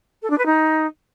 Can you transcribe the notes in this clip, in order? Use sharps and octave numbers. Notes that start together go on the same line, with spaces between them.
A4
D4
B4
D#4